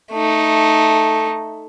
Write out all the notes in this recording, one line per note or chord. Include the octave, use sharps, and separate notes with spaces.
A3 D#4